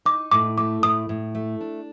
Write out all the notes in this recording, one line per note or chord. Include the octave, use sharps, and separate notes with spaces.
D#4 D6
A2 D6
A3 D6
A2 D#6
A2
A3
D4